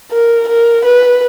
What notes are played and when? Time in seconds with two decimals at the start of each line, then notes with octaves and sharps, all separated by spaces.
0.11 A#4
0.48 A#4
0.85 B4